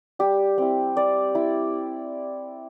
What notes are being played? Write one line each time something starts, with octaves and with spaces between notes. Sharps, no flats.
G3 G4
C4 E4
G3 D5
E4